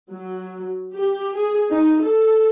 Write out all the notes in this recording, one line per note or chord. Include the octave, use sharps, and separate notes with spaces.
F#3
G4
G#4
D#4
A4